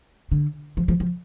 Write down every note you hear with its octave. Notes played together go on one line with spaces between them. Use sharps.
D3
F3
F3
F3